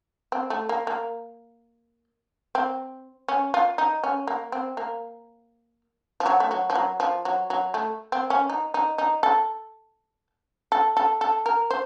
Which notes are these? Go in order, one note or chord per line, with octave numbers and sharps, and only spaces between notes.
C4
A3
A#3
A#3
C4
C#4
F4
D#4
C#4
A#3
C4
A#3
F3
F#3
A3
F#3
F3
F#3
F3
F#3
F#3
A3
C4
C#4
D#4
D#4
D#4
A4
A4
A4
A4
A#4
C5